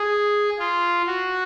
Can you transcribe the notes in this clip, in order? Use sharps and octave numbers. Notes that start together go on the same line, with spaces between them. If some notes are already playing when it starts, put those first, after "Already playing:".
Already playing: G#4
F4
F#4